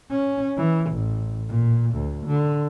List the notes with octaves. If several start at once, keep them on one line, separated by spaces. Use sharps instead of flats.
C#4
E3
A1
A#2
D2
D3